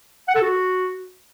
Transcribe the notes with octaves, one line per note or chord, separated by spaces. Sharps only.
F#5
A4
F#4